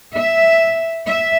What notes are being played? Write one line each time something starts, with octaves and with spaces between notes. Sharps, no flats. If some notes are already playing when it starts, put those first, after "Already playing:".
E5
E5